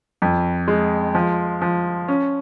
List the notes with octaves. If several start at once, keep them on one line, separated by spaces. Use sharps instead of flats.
F2
G#3
F3
F3
C#4